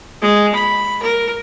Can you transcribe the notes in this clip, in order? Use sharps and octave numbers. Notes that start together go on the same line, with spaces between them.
G#3
B5
A#4